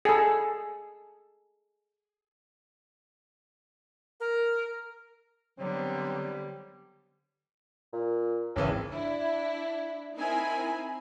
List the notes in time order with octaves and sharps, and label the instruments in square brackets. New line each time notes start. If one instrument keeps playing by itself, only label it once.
[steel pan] G#4 A4
[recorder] A#4
[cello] D3 B3 [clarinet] F#3 [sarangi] G3 [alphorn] C4
[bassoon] A#2
[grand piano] G#1 C#3 E3 [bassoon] C#4
[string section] D4 E4
C4 D#4 E4 A#4 G#5 B5